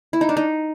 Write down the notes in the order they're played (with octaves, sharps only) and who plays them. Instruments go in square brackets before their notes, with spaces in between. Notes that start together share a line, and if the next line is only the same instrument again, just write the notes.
[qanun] E4
D#4
D4
D#4